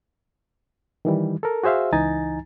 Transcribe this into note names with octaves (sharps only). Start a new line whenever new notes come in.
D#3 E3 G3
A4 A#4
F#4 G#4 C5 E5 F5
C#2 E3 D#4 G#5 A#5 A6